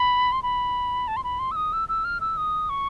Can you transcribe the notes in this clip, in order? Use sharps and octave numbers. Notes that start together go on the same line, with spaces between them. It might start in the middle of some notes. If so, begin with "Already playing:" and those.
Already playing: B5
C6
B5
A5
C6
B5
C6
E6
D#6
E6
E6
F6
E6
D#6
C#6